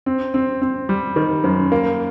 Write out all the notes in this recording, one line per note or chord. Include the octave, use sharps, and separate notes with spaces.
C4
C4
C4
G3
D#3
F#2
A#3